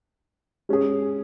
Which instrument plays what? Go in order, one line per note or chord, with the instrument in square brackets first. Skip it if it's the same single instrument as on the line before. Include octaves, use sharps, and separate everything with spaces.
[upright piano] G#3 C#4 G#4